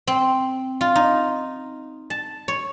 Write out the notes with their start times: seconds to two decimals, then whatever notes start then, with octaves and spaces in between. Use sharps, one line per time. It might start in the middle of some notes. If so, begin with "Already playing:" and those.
0.07 C4
0.81 F4
0.95 D#4
2.10 A5
2.48 C#5